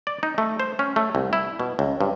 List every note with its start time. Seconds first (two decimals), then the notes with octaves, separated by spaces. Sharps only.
0.07 D5
0.23 D#4
0.38 A3
0.60 C5
0.79 C#4
0.96 A3
1.15 C2
1.33 E4
1.59 B2
1.79 C#2
2.01 G2